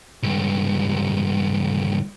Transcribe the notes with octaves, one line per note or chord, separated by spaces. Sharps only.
C#2 G2